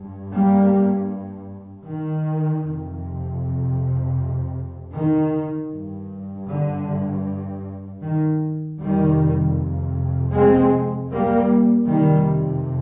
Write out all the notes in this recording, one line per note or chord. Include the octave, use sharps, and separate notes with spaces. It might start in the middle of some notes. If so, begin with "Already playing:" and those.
Already playing: G2
G3 A#3
D#3
F2 C3
D#3
G2
D3
D#3
F2 C3 D#3 G3
G#3 C4
G3 A#3
F2 C3 D#3 G3